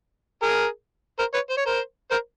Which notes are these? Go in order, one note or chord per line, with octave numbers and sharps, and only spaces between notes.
G#4 A#4
A#4 C5
B4 C#5
C5
C#5
A#4 C5
A#4 C5